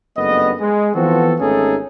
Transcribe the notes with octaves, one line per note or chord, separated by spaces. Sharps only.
F#1 G2 A3 B3 D#5
G#3
E3 F3 B3 C4 F#4 A4
G#1 A3 C#4 D#4 G#4 A4